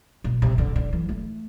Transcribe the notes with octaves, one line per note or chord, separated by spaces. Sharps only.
B2
C3
D3
D3
E3
A3